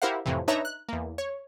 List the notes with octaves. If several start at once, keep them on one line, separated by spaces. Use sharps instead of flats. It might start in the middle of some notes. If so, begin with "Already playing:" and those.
E4 G4 A#4 C5 F5 F#5
F2 A2 C3 E3
D4 D#4 B4 C#5 E5 A#5
F#6
E2 A#3
C#5